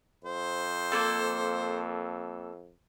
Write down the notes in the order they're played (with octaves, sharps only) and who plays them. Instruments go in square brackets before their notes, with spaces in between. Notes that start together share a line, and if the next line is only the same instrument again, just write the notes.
[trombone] F2 [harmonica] C5
[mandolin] A#3 C4 A4